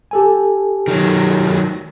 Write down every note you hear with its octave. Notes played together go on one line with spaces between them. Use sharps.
G4 A4 G#5
D#3 F#3